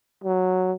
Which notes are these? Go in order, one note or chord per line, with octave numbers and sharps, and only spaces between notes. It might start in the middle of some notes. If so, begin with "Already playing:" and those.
F#3